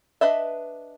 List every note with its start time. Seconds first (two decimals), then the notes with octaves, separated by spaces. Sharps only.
0.21 D4 B4 D#5 E5